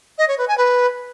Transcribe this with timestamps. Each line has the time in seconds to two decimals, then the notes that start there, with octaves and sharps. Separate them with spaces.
0.18 D#5
0.28 C#5
0.38 B4
0.48 G#5
0.58 B4